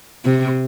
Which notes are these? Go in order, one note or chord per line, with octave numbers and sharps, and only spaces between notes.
C3